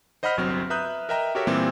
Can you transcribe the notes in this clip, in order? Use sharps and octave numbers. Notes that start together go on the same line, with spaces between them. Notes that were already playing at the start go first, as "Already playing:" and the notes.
C5 D#5 F#5 B5 F6 B6
G1 C2 F#3 C4 F6
B4 E5 A#5 D#6 F#6 G6
A#4 D#5 E5 G5 A#5
F#4 G4 A4 A#4 C#5 E5
A#2 E3 G3 A#3 C4